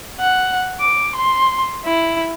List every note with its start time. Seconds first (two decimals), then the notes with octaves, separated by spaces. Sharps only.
0.19 F#5
0.80 D6
1.16 C6
1.84 E4